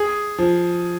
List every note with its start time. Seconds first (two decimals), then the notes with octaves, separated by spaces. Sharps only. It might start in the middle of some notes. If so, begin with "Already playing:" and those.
Already playing: G#4
0.38 F3